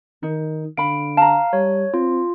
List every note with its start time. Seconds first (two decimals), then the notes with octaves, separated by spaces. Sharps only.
0.23 D#3 D#4
0.77 D3 F5 B5 D7
1.17 F5 A5 A#5
1.53 G3 C#5
1.94 C4 F4